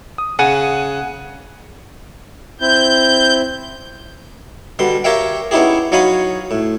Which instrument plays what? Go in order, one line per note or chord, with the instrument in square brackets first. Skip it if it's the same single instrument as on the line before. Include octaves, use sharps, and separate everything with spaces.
[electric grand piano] D#6
[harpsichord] C#3 [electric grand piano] F#5 G#5 D#7
[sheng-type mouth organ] C4 E4 [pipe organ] G6
[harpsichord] B2 D3 G3 C6
G4 A#4 C#5 E5 F5 G5
B3 C#4 D#4 E4 G4 G#4
F#3 D#4 C#5 F5 B5 D#6
A2